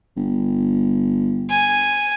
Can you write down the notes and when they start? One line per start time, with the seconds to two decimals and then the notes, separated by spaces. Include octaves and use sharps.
0.16 G1
1.49 G#5